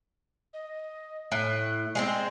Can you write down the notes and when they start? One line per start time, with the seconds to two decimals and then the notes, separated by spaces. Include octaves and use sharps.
0.53 D#5
1.32 A2 F#6
1.95 G#3 B3 C4 D5